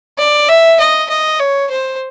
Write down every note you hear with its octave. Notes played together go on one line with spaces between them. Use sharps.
D5
E5
D#5
D#5
C#5
C5